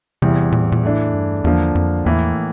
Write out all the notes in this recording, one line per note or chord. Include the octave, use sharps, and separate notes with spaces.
E2 C3 E3 G3 C4
A#2
A2
A#2
A2 E3 A3 D4
G2
E2 D3 F3 A#3 D4 F4
F2
E2 A2 E3 A#3